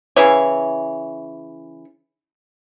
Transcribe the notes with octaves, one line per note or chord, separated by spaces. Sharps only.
C#3 E3 E4 C#5